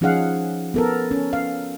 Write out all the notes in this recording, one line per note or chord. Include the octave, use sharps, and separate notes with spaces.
F3 C#4 D#4 G#4 F5 F#5
B3 A4 A#4
C#4
F5